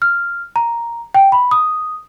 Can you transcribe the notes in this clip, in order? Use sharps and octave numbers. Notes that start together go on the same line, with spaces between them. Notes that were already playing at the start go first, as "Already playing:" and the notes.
F6
A#5
G5
B5
D#6